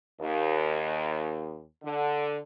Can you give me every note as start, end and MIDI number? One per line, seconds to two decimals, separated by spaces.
0.20 1.62 39
1.83 2.38 50